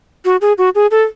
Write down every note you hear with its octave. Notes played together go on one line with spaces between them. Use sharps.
F#4
G#4
F#4
G#4
A4